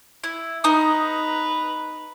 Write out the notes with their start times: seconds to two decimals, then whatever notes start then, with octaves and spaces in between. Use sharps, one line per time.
0.24 E4
0.64 D#4 B4 A#5 D#6